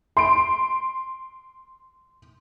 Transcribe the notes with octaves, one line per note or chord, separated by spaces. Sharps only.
C6 D7